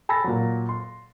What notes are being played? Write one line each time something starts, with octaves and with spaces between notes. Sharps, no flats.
G#5 A5 B5 E6 A6 A#6
A#2 F#3
C6